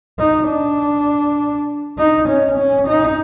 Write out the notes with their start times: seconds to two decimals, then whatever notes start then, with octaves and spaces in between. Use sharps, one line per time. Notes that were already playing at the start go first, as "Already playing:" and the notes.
0.19 D#4
0.48 D4
1.98 D#4
2.28 C#4
2.58 C#4
2.87 D#4